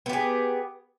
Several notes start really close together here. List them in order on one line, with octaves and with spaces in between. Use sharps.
B3 G4 G#4